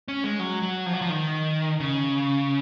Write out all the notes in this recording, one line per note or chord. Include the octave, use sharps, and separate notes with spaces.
C#4
G#3
F#3
F#3
F3
F#3
F3
D#3
C#3